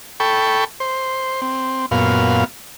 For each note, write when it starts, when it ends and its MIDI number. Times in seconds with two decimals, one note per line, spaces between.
0.20 0.64 69
0.20 0.64 79
0.20 0.64 83
0.20 0.64 85
0.80 1.41 72
1.42 1.86 60
1.91 2.44 42
1.91 2.44 46
1.91 2.44 59
1.91 2.44 77